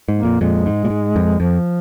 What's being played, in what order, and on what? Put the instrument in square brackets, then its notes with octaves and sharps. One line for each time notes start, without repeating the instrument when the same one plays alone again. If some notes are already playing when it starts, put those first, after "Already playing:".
[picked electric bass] G#2
[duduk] A#3
[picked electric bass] F2 A#2
[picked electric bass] F2 A#2 [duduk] G#3
[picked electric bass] G#2
A#2
G#2
F2
[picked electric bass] F2 [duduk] F3